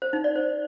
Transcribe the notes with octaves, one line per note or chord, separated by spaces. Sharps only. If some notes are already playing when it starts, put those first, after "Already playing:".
C5
D#4
D5
C5